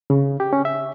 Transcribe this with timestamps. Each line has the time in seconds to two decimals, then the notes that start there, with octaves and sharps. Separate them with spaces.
0.10 C#3
0.40 G4
0.53 C#4
0.65 E5